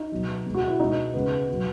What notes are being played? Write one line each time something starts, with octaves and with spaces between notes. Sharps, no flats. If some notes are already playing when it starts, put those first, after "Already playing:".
Already playing: D#4
B2 F#3
B2 G#3
F#4
E4
B2 G#3 D#4
C#3 G#3 B3
B2 F#3